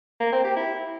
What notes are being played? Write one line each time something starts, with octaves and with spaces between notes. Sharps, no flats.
A#3
C4
G4
E4